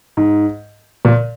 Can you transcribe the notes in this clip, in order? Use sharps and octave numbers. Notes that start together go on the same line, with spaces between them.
G#2
A#2